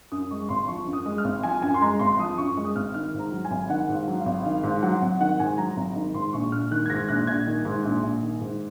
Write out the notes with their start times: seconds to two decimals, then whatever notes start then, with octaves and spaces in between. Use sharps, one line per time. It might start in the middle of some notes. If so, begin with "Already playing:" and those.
0.12 F#2 D#6
0.31 G#3 C#6
0.49 G#1 C6
0.68 F3 C#6
0.87 F#2
0.93 D#6
1.05 G#3
1.18 F6
1.24 G#1
1.43 F3 G#5
1.62 F#2 G#5
1.74 C6
1.82 G#3 A#5
2.00 G#1 C6
2.19 F3 D#6
2.38 F#2 C#6
2.57 G#3
2.65 D#6
2.75 G#1 F6
2.94 D#3 F6
3.14 G#2
3.19 A#5
3.32 F#3
3.45 G#5
3.50 G#1
3.70 D#3 F#5
3.89 G#2
3.95 F5
4.08 F#3
4.20 F5
4.26 G#1
4.45 D#3 F5
4.63 G#2 F5
4.83 F#3 F#5
5.01 G#1 F#5
5.20 D#3 F#5
5.40 G#2 G#5
5.58 F#3 A#5
5.77 G#1 A#5
5.96 D#3
6.14 G#2 C6
6.33 A#1 C#6
6.52 A#1 F6
6.71 D#3 F#6
6.86 G#6
6.90 G#2 A#6
7.09 A#1 F#6
7.27 A#1 G#6
7.47 D#3
7.65 G#2
7.84 A#1
8.03 A#1
8.22 D#3
8.40 G#2